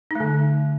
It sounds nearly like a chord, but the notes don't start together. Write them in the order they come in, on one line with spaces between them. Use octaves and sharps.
D#4 A3 D3